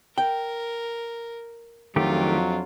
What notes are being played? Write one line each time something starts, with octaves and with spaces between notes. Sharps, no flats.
A#4 G5
F2 D#3 F#3 A3 D4 F4 G4